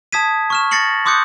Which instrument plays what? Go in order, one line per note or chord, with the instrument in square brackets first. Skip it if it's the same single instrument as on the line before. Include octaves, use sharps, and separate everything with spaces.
[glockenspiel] A5 D#6 G#6 B6 D#7
C#6 F6 E7
A6 A#6 C7 C#7 F#7
C6 D6 D#6 F#6 G6 C#7